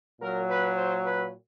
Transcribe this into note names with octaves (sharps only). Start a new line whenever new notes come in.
A#2 F#3 A#4
B4
C5
B4